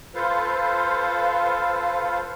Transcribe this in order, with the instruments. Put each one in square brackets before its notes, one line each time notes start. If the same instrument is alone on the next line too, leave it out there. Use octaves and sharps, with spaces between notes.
[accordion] F4 A4 B4 C5 F5